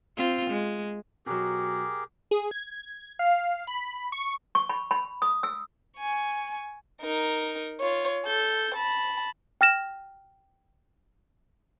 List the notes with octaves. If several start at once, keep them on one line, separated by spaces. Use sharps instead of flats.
C4 F4
G#3
B2 F#3 G4 G#4 A#4
G#4
G#6
F5
B5
C#6
C#6
B5
B5
D#6
E6
G#5 C#6
D#4 A#4
F4 C#5
A4 G6
A5 B5
G5 F6 A#6 E7